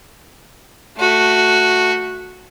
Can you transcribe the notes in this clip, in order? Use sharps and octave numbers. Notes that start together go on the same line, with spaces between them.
A3 F#4